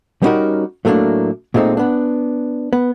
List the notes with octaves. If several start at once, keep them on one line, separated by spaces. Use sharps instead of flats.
G3 B3 C#4 D#4 F#4 A#4
A2 F#3 A3 A#3 D4
A#2 G#3 A3 C4 D#4
B3 D4
B3